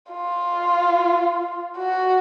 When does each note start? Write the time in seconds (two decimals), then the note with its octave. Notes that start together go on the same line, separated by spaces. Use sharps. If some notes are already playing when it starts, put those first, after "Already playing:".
0.12 F4
1.78 F#4